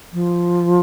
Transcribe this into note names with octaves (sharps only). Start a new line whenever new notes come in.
F3